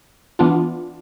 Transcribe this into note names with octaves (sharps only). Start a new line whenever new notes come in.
E3 B3 D4 F4